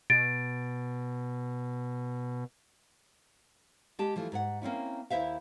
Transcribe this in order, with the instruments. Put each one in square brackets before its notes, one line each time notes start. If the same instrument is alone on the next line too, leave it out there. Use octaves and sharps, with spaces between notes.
[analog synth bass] B2 [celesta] A6 D7
[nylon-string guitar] G#3 G4 A5
E3 F3 A3
G#2 A#4 F#5
A#3 C4 C#4 E4
D#2 E4 C5 E5 F5